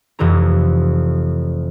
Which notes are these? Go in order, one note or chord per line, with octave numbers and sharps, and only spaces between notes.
F1 F2 C3 E3 E4 A#5